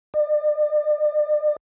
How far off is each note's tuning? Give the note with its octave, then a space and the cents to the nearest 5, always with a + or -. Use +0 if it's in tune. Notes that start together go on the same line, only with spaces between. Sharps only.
D5 +40